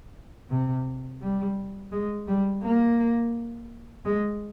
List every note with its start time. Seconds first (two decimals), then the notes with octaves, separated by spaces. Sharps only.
0.50 C3
1.21 G3
1.92 G#3
2.28 G3
2.63 A#3
4.05 G#3